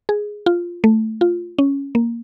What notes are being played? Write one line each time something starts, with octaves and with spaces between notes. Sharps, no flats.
G#4
F4
A3
F4
C#4
A#3